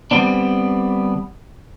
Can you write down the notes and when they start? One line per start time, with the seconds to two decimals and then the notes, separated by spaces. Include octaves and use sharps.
0.11 D3 G3 G#3 B3 C4 D4